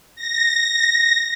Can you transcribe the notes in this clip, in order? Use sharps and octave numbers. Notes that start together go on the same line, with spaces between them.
A#6